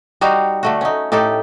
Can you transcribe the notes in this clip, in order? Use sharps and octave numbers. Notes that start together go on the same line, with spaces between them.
G3 D#4 F#4 F5
D3 A3 F#4
C#4 D#4
A2 D#4 G4 A4